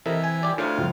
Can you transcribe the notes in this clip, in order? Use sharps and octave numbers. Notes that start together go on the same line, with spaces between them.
C3 E3 A4 A#4 D#5
G#5
G4 D5
D2 A2 D4 F4 C5
C#2 F3 F#3